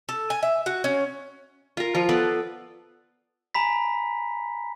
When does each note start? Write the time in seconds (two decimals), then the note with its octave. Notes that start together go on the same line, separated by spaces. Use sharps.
0.09 A4
0.30 G#5
0.43 E5
0.66 F#4
0.84 C#4
1.77 F4 A#4
1.95 F3 F4
2.09 B3 A4 B4 D5
3.55 G#5 A#5 B5 B6